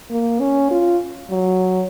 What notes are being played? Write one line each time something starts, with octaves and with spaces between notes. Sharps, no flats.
A#3
C#4
F4
F#3